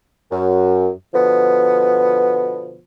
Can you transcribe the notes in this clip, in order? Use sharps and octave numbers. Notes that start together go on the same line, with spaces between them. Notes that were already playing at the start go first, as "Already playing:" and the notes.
F#2
B2 D3 F3 B3